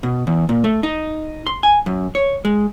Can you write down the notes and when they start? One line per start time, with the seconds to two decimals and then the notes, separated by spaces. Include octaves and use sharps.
0.03 B2
0.27 E2
0.49 A#2
0.64 A3
0.83 D#4
1.46 C6
1.63 G#5
1.86 F#2
2.15 C#5
2.45 G#3